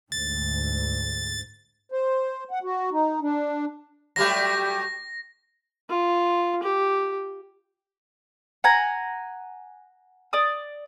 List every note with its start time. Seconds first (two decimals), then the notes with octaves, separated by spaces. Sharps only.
0.12 D2 G#2 A6
1.92 C5
2.51 F#5
2.63 F#4
2.92 D#4
3.22 D4
4.16 F#3 G3 A3 G4 A#6
5.90 F4
6.63 G4
8.64 F#5 G#5 A#5
10.33 D5 D#6